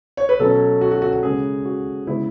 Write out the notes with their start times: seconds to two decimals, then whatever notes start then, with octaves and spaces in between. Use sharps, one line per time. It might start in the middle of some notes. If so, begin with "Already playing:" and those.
0.17 C#5
0.29 B4
0.39 B2 F#3 C#4 A4
0.81 F#4
0.91 F#4
1.02 F#4
1.13 F#4
1.23 C#3 G#3 C#4 G#4
1.65 F#4
2.07 C#3 G#3 B3 E4